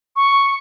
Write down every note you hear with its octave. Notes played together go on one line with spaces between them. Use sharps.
C#6